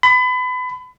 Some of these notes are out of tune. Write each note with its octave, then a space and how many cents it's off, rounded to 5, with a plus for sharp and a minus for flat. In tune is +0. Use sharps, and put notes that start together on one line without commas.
B5 +30